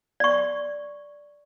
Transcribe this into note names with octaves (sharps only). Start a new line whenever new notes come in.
D5 C#6